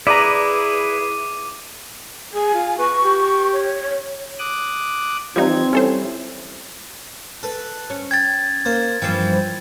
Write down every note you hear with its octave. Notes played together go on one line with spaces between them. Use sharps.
E4 G#4 B4 D5 A#5 D6 D#7
G#4 G#5
F4
B4 C#6
G4
C#5
D6 D#6 F#6
E3 F3 G3 C4 D#4 G#6
G3 C#4 E4 A4 C5
A4 B4
C#4
G5 G#6 A6
A#3 C5
G2 E3 F3 G5